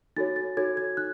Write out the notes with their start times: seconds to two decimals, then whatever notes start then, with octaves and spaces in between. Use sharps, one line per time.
0.16 D#4 F#4 A4 C#5 A6
0.36 A6
0.57 D#4 F#4 A4 C#5 G#6
0.77 G#6
0.97 D#4 F#6